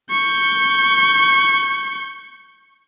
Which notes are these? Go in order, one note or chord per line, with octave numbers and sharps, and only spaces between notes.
C#6 G6